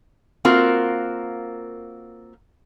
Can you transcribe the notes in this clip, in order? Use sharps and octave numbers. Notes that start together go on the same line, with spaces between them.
A#3 C4 F4 F#4 A#4